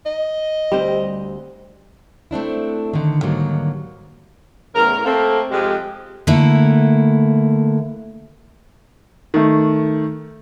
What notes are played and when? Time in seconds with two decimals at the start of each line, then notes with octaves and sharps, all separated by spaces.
0.06 D#5
0.72 D2 G3 C4 C5
2.31 A3 C4 D4 E4
2.93 D3 D#3
3.21 G#2 D3 D#3 F#3 G3 A#3
4.75 E2 A2 C#3 A#4
5.05 A3 A#3 C4 A4
5.51 F2 C3 G#3 G4
6.27 D3 A3 A#3 E4
9.34 D#3 A3